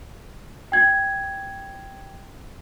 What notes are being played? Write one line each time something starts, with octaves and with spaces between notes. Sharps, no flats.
G5 G#6